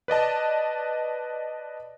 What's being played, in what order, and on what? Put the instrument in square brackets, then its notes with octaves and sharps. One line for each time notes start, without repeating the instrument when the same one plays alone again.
[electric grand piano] B4 D5 D#5 A5